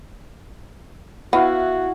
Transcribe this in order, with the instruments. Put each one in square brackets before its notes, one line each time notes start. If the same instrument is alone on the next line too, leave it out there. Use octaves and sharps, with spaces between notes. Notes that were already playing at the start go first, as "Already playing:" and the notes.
[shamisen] B3 [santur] E4 F5 F#5 [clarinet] F#4